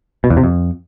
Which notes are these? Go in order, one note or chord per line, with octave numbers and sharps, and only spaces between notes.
B2
E2
C3
F2